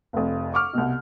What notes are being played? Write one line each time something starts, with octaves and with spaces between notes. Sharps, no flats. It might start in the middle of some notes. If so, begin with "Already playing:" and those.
F1 F2
C#6 D6 F6
C2 B2